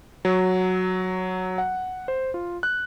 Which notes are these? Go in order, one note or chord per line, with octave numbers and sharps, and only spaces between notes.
F#3
F#5
C5
F4
F#6